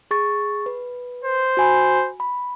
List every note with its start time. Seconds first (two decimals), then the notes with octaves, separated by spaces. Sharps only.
0.11 G#4 C#6 A6
0.66 B4
1.25 C5
1.57 F#4 G#5 B5
2.20 B5